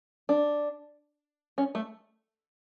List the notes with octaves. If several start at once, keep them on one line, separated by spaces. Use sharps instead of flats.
D4
C#4
A3